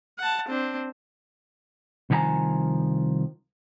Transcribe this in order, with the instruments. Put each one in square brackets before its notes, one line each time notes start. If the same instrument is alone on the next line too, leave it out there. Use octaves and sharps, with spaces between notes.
[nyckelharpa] F#5 A5
C4 D4
[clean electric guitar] C2 D#3 F3 G4 G#5 A#5